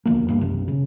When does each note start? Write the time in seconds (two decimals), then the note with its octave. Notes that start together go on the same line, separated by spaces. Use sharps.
0.05 E1 D2 F3 A#3
0.28 G2 A#3
0.41 B1 F#2 C3
0.68 C#3